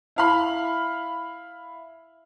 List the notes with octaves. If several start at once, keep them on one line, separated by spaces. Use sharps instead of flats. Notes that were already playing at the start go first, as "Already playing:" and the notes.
E4 F5 B5